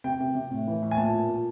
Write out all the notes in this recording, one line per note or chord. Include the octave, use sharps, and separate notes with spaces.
C3 G5
C3
C3
A2
E3
A2
G#5
A#2 A5
A#2
A#2